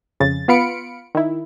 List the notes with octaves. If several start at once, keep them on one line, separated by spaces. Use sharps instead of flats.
F2 C#3 A6
B3 F4 F5 B5 C#7 D7
D#3 E4